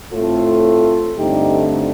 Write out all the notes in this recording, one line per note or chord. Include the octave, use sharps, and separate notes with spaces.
A2 A3 C4 F4 A4
G2 D3 A3 C4 D#4 G4